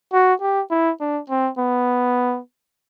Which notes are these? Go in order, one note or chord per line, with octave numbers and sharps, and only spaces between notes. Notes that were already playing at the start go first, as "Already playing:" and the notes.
F#4
G4
E4
D4
C4
B3